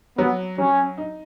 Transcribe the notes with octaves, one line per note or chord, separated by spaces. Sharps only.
F#3 B3
F#3 C#4
D#4